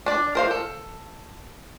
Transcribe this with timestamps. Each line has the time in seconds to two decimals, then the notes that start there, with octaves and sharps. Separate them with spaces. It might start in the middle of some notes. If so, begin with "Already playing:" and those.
0.06 D4 D5
0.35 A#4 C5 F5
0.51 A4